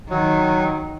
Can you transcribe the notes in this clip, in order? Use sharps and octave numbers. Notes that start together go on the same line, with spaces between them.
D#3 F#3